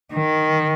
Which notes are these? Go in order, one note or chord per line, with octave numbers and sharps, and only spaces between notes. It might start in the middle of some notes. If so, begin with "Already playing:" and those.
D#3